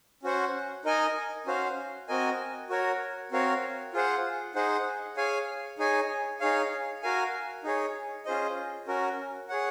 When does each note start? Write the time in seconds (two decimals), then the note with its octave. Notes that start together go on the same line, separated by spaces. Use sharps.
0.23 C#4 F#4 C5 F#5
0.85 D#4 A#4 D#5 G#5
1.46 C#4 F#4 C5 F5
2.08 C4 F#4 A#4 D#5 G#5
2.70 F#4 A#4 C#5
3.32 C4 F#4 A#4 C#5 F5
3.94 F4 G#4 C5 F#5
4.55 D#4 G#4 C5 F#5
5.17 G#4 C#5 F5 G#5
5.79 D#4 G#4 C#5 G#5
6.40 D#4 G#4 C#5 F5
7.03 F#4 A#4 F5 G#5
7.64 D#4 G#4 C#5
8.25 C#4 F4 G#4 C5 D#5
8.87 C#4 F#4 A#4
9.49 G#4 C#5 F#5